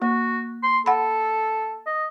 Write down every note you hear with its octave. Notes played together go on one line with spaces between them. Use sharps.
A#3 F#4
C6
A4 F#5 B5
D#5